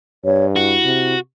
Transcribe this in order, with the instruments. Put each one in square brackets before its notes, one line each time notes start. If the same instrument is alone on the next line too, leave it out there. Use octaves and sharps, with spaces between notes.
[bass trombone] G2 [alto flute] C#5
[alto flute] E4 [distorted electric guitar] F#4
[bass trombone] C3